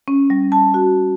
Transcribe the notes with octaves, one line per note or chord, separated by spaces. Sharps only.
C#4
G3
A5
F#4